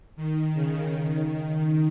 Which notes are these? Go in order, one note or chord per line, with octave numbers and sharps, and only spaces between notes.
D#3
C#3
D#3